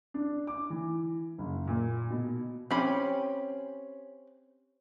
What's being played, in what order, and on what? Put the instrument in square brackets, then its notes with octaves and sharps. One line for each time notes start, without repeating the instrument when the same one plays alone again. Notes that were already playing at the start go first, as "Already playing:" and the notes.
[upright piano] D4
D6
E3
F#1
A#2
B2
[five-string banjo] C4 B5 [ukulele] C#4 G4